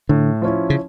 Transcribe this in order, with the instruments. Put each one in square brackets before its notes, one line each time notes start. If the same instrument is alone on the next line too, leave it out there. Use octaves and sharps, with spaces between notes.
[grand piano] A2 [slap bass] D3
[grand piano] F3 C#4 E4
[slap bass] C#3